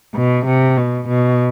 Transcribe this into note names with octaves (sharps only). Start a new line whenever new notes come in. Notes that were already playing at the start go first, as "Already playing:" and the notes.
B2
C3
B2
B2